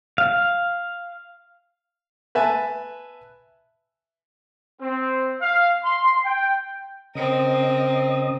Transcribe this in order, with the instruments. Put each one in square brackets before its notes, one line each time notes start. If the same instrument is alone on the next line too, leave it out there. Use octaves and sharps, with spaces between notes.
[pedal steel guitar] F5
[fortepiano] B4 E5 G#5 A5
[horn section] C4
F5
C6
G5
[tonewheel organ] C#3 D#5 [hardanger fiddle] C4 A#4